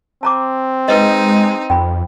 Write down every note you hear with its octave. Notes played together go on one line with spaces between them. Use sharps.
C4 A5 A#5 D6
G#3 D#4 B4 D#5
F2 G5 B5